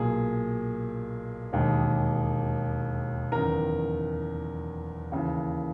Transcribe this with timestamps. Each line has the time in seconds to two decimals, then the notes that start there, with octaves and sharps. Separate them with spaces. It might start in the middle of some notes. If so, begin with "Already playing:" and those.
Already playing: B1 A#2 A#3 G#4
1.53 E1 D#2 D#3 G#3
3.32 F#1 E2 D#3 A#4
5.12 D#2 C#3 E3